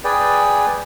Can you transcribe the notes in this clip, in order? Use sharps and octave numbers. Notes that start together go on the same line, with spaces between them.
G#4 B4 D5 G5